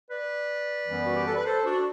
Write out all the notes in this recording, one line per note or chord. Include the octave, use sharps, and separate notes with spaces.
B4 D5
F#2 E3 G3 B3
F#4
G4
A4
B4
A4 C5
D4 F#4